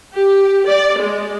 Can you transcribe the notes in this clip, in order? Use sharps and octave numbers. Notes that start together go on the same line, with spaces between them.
G4
D5
G#3